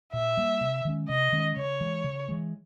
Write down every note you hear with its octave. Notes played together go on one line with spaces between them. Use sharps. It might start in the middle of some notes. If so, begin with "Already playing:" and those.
A#2 E5
G3 A#3
C3
D#3 G#3 C#4
C3 D#5
D#3 G#3 C#4
C#3 C#5
E3 G#3
C#3
E3 G#3